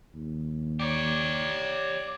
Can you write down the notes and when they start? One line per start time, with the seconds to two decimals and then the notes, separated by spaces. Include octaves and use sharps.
0.14 D#2
0.80 G4 C#5 D5